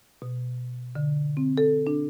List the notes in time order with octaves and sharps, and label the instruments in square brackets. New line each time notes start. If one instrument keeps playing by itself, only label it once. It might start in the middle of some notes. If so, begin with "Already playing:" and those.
[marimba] B2
D3
C4
A4
D4